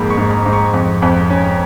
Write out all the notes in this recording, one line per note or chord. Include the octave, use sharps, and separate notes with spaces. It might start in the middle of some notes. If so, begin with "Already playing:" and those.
Already playing: F2 G#2 A#3 B5
C#6
G#2
A#5
G#2
C#6
F2
F2
C#4